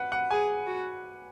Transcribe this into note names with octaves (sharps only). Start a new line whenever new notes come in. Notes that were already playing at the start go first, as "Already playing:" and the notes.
Already playing: B4 F#5
F#5
G#4 G#5
F#4